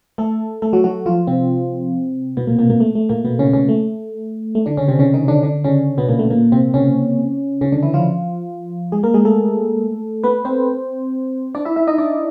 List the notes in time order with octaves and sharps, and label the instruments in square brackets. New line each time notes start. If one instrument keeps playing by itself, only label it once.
[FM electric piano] A3 A4
A3 A4
F#3 F#4
F#3 F#4
F3 F4
C3 C4
B2 B3
A#2 A#3
A#2 A#3
A#2 A#3
A3
A3
A#2 A#3
B2 B3
C#3 C#4
C#3 C#4
A3
A3
D3 D4
C#3 C#4
C3 C4
C#3 C#4
D#3 D#4
D3 D4
D3 D4
C#3 C#4
B2 B3
A#2 A#3
A3
A#2 A#3
C3 C4
C#3 C#4
C#3 C#4
D3 D4
E3 E4
F3 F4
G#3 G#4
A#3 A#4
G#3 G#4
A3 A4
B3 B4
C4 C5
D4 D5
E4 E5
E4 E5
D#4 D#5
D4 D5